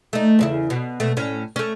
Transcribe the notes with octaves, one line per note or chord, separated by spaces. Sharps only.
A3 D#4
E2 C#3 E4
B2
B2 A3
A2 C#4
A3 C#4